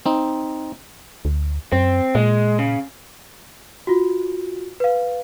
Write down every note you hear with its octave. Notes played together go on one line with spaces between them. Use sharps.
C4 D#4
D2
F#2 C4
A#2 G#3
C#3
F4 F#4
B4 F5